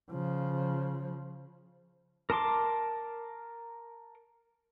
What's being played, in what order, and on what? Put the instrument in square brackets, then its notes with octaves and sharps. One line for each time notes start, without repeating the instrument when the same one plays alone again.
[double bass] C#3 F3
[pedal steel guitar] A#4 A5 C6 D6